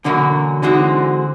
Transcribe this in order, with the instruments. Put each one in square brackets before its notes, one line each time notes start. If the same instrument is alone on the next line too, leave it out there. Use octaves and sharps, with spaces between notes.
[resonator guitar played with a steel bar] E2 B2 F#3 A#3 C#4 [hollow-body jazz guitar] D3
[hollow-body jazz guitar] D3 [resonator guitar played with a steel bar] E3 G#3 C4 D#4 F#4